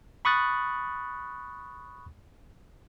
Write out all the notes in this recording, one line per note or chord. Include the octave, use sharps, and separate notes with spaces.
B5 C#6 D#6 F#6 A6